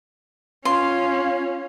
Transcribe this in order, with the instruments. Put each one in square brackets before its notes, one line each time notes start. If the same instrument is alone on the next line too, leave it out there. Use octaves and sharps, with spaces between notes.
[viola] C#4 [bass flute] F4 [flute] F5 [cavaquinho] C6